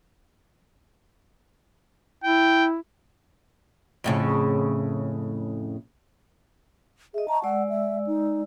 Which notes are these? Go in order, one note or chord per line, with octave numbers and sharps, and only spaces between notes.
E4 G5
F2 A2 C#3
G#4 D#5 E5
A5 A#5 C#6
G#3 D5 F#5 E6
E5
D#4